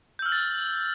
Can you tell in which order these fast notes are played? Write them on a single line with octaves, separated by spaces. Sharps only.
G6 E6 F6 F#7 A6